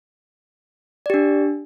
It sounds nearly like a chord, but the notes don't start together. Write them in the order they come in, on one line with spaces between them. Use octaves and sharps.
D5 G4 D4